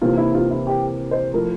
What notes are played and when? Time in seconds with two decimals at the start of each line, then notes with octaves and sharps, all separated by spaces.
0.01 C3 E3 A#3 F4
0.17 E4
0.34 F4
0.50 E4
0.67 G4
1.11 C5
1.33 F3 A3 E4 A#4